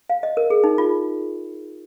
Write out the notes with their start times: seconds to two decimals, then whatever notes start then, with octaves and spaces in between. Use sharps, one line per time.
0.10 F5
0.23 D#5
0.37 A#4
0.50 G#4
0.64 D#4
0.78 F4